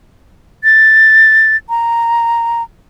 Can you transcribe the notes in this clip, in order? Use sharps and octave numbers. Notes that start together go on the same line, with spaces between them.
A6
A#5